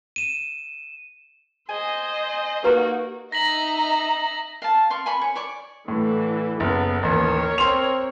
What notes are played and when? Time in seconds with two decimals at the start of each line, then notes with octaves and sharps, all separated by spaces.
0.16 D#7 E7
1.69 C5 D#5 G#5
2.64 A#3 D#4 F#4 G4 B4 A#5
3.32 D#4 E5 A#5 A#6 B6 F#7
4.62 F5 A5
4.90 D5 F5 C6 C#6
5.06 G#5 B5 C#6
5.22 C#5
5.35 C#5 D5 C#6 D6
5.88 A2 D3 E3
6.60 F#1 B3
7.03 A1 D#2 A#4 C#5
7.58 C4 C6 F7